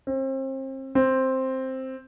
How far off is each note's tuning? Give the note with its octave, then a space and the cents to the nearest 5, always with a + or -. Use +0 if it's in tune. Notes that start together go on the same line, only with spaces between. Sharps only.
C4 +35
C4 +5